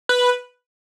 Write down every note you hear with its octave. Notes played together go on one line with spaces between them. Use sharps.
B4